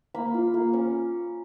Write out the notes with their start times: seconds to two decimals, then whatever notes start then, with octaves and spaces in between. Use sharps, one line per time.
0.14 A#3 B5
0.34 F4
0.54 A#3
0.73 C#4